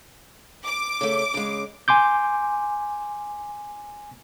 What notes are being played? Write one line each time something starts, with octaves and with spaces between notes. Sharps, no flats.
D6
C#3 A3
C#3 G#3
G#5 C6 D6 G6